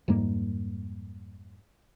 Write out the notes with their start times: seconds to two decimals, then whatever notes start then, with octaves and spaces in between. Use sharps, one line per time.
0.08 F2 G#2 G3 A#3